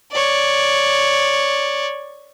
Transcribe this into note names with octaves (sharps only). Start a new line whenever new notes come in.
C#5 D5